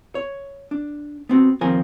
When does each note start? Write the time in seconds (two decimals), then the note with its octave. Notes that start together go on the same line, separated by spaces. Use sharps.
0.15 C#5
0.71 D4
1.29 B3 C4 F#4
1.61 D#2 F3 C4 A#4 G#5